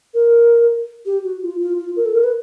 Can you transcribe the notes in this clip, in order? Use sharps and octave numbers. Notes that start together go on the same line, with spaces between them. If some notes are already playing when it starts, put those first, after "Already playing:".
A#4
G4
F#4
F4
F4
F4
A#4
A4
A#4
B4